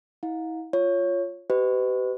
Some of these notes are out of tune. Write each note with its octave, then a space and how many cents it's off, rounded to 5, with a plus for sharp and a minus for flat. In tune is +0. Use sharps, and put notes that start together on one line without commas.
E4 -40 F5 +40
F4 +0 C#5 +0
G4 -35 B4 +35 D#5 -10